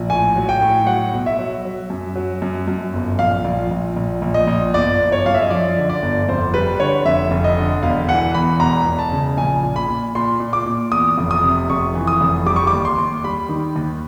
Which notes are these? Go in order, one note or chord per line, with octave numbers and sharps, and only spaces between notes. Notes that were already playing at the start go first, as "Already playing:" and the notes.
Already playing: A#1
A2 G#5
F#3
G5
A2
F#3 F#5
B1
E5
F#3
F#3
F#2
F#3
F#2
F#2
G1
A#1 F5
A#1
A#1
A#1
A#1
D#5
A#1
G1 D5
G1
C#5
F#2 F5
E5
D#5
F3 D5
D3
D5
G1
F1 C5
G3 B4
D3 C#5
F1 E5
F1
D#5
D3
E1 F5
E3 F#5
E2 B5
E1 A#5
E1
A5
C#3
A#1 G#5
A#2
B5
A#2
A#2 C6
A#2
D6
A#2
E2 D#6
F1
D#6
C3
F1 C#6
E3
D#6
F1
G3 D6
C#6
D6
D#2
C6
D#2
G3 B5
D#3
D#2